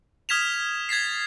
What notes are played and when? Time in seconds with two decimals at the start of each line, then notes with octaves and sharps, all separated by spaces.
0.29 D#6 F6 G#6 B6 E7 F7
0.89 G#6 A6 B6 C7